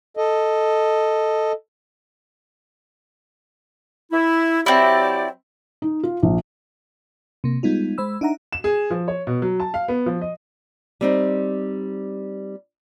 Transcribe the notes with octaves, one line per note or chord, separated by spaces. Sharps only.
A4 D#5
E4
F#3 C4 E4 G4 D5
D#4
F4
A#1
C3 A#3
G3 G#3 B3 D#4 F4
G#3 C5 B5 E6
D4 D#4 E5 F#5 A#5
E7
G#4
F3
C#5
B2
F#3
A5
F5
B3
F3
D#5
G3 C4 D#4